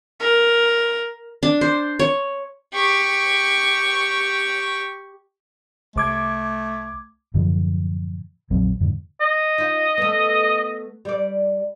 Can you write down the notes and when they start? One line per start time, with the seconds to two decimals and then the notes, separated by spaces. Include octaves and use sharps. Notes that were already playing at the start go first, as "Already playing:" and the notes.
0.20 A#4
1.43 D4
1.61 C5
1.99 C#5
2.73 G4 C#6
5.96 C2 A3 D6 G#6
7.34 F#2 A2 D3 F3
8.50 A#1 F2 F#3 C4
8.80 F2 G#2 D3
9.21 D#5
9.58 D#4 F4
9.98 A3 B3
11.05 G3 D5